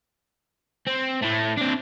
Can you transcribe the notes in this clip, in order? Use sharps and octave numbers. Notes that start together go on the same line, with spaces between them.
C4
A2 A3
C4 D4